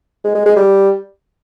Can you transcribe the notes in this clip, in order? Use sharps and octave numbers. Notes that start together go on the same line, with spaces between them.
G#3
G#3
G#3
G3